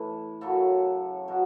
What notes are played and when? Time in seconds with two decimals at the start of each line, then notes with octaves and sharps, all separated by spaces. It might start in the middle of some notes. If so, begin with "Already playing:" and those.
Already playing: A2 E3 A4
0.41 F#2 C#3 F#3 A4
1.28 B2 F#3